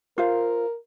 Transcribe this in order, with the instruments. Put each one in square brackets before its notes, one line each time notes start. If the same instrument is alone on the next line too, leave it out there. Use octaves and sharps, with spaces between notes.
[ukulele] F4 C5 F5 [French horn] A#4